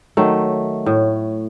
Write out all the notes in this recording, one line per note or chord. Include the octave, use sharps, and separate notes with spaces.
D#3 F#3 A3
A2